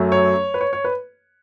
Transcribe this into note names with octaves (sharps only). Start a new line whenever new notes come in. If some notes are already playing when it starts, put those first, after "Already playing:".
Already playing: F#2 F#3 A3
C#5
B4
C#5
C#5
B4